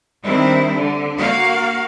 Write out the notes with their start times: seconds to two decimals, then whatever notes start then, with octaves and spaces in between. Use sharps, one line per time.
0.24 D#3 G3 C4 D4 E4
0.74 D3
1.18 A#3 F#4 F5